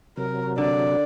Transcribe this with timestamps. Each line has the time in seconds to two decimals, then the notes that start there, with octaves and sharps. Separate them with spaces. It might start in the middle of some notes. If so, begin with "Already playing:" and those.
0.17 C3 F#3 A#4
0.58 D3 D5